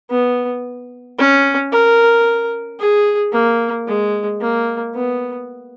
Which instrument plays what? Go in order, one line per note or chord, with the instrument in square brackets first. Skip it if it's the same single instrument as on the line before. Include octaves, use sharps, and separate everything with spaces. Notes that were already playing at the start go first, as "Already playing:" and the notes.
[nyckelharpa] B3
C#4
A#4
G#4
A#3
G#3
A#3
B3